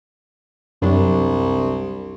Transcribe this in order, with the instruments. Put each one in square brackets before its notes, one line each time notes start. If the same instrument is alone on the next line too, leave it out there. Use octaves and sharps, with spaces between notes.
[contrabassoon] C2 [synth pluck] F#2 F#3 D4